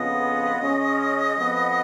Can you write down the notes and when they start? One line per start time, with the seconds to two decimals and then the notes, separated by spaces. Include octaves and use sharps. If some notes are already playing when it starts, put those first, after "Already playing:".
Already playing: F2 C#3 F3 B3 D#5
0.60 C#3 G#3 C#4 G#4
1.38 F2 F3 B3